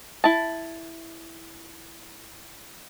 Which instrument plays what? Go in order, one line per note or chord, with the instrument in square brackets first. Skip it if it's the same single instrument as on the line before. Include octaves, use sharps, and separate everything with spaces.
[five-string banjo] E4 A5